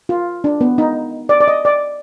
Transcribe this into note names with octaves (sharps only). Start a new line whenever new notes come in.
F4
D4
B3
D#4
D5
D5
D#5
D5